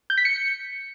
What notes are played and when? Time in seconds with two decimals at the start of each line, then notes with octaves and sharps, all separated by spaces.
0.10 G6
0.18 B6
0.25 C#7